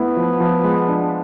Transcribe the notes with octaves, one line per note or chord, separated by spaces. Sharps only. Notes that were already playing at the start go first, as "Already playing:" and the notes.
Already playing: A3 B3 E4
F3
F3
G#3
D4